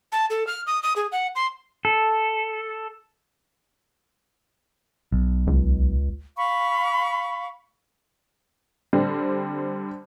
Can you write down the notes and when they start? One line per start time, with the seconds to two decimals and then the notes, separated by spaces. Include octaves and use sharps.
0.12 A5
0.30 A4
0.47 F6
0.66 D#6
0.83 D#6
0.96 G#4
1.12 F#5
1.35 C6
1.85 A4
5.12 B1
5.47 C#2
6.37 F5 B5 C#6
8.93 D3 G3 C4